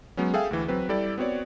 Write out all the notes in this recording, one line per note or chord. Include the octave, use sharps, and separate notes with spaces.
F#3 G#3 B3 C#4
G#4 A4 E5 F5 G5 G#5
D2 E3
F#3 C4 B4
G3 E4 G4 A4 D5
B3 C4 F#4 C#5 D5